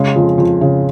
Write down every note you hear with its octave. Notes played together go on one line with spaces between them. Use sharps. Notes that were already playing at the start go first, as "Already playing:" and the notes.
Already playing: C#3 G#3 C6
F2
F2
C#3